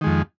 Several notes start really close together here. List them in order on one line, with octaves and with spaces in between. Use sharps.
D#3 G#3 F2